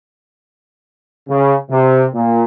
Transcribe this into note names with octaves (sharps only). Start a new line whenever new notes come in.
C#3
C3
A#2